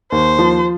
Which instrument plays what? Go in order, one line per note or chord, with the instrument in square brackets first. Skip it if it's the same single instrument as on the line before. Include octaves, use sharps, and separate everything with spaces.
[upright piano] D#2 [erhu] C5
[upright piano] F3